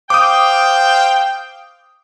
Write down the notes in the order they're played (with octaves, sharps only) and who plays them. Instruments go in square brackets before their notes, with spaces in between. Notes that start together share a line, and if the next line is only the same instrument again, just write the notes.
[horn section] C5 F5 G5 [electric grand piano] D6 D#6